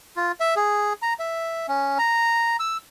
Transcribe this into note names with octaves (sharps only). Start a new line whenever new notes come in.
F4
E5
G#4
A#5
E5
C#4
A#5
E6